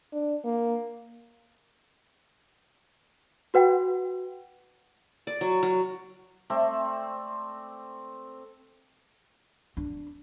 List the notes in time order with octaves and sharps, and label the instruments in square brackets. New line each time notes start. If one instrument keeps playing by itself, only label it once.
[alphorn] D4
A#3
[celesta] F#4 B4 F#5 G5
[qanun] D5
F#3
F#3
[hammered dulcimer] A3 C4 D5 A5
[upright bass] D4